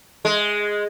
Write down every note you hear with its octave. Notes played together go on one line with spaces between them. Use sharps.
G#3